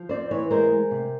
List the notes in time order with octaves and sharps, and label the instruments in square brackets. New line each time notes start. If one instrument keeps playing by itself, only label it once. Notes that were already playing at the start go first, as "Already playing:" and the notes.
Already playing: [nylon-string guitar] F3
C4 C5 D5
E3 B4 C#5
G#3 A#4 C5
G#3
C3